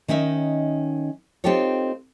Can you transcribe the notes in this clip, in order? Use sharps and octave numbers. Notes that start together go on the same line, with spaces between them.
D#3 C#4 D#4 E5
C4 D#4 F4 G4 A4 C#5